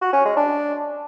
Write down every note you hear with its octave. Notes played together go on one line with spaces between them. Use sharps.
F#4
C#4
G#3
D4